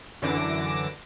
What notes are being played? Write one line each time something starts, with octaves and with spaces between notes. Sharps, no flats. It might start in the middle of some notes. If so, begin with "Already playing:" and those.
F#2 D3 E3 D6 A#6 E7